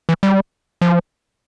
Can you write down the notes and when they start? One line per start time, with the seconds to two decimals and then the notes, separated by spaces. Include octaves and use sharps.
0.09 E3
0.23 G3
0.81 F3